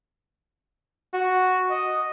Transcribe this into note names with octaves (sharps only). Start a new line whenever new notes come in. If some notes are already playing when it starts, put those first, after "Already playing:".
F#4
D#5